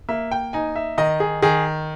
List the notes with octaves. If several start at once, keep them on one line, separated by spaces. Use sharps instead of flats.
A#3 E5
G5
D#4 G#5
E5
D#3 D#5
G#4
D#3 G#4